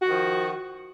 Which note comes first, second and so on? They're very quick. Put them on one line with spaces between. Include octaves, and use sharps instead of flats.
F#4 D#3 F3